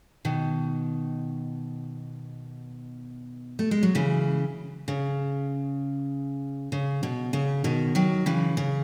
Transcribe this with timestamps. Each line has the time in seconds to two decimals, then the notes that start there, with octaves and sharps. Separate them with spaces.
0.25 B2 D#3
3.59 A3
3.71 G#3
3.83 F#3
3.95 C#3 E3
4.88 C#3
6.72 C#3
7.03 B2
7.33 C#3
7.64 B2 D#3
7.95 D#3 F#3
8.26 C#3 E3
8.57 C#3